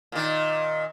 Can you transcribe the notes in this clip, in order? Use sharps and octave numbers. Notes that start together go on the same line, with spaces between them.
A#2 D#3